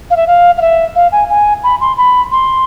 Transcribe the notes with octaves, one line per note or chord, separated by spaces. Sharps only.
F5
E5
F5
F5
E5
F5
G#5
G#5
B5
C6
B5
C6